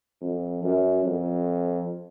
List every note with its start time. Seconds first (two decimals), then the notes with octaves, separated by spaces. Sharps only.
0.21 F2
0.63 F#2
1.05 F2